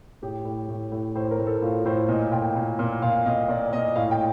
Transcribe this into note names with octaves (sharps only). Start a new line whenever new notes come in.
A2 G4
A2
A2
A2
A2 C5
A#4
A2
A4
A2 F4
A2 C5
A#2 D#5
A#2 G5
A#2
A#2
A#2 F5
A#2 D#5
A#2 D5
A#2 D#5
A2 F5
G5